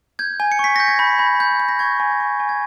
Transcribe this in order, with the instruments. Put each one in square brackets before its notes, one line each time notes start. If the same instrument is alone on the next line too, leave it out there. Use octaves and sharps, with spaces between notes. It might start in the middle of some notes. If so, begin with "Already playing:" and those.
[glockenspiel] G6 G#6
G#5
C#7
C#6 B6
G6 A#6
G#6
B5 G6
B5
G6
G6
A#6
C#6 G#6
G#5
C#6
G#5
G#6